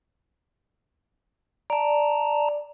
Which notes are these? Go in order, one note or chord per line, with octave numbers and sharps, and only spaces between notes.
D5 A5 A#5